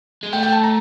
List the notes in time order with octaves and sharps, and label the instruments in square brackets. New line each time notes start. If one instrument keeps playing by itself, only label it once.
[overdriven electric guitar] G#3
[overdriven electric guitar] A3 [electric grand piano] G5
[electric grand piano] G5
A5
A#5